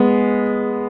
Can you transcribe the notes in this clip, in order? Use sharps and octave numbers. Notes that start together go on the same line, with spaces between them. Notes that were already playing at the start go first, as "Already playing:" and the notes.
Already playing: G#3 B3